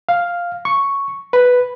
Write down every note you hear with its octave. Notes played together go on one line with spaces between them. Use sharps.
F5
C#6
B4